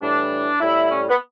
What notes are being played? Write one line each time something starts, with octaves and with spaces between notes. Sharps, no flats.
A2 E3 G3 D4
A2 G3 E4
C#4
B3